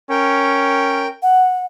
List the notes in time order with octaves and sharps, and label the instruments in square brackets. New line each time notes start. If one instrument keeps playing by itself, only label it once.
[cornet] C#4 [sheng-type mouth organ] A#4 G5
[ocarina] F#5